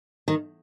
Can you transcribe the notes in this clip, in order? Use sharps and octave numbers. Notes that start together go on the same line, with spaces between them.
D#3